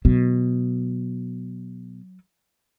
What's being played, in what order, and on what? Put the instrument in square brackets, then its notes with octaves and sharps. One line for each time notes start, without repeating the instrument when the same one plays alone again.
[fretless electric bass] B2 [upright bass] F#3